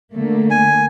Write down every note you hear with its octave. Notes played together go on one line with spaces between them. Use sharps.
D3 A3 A#3
G#5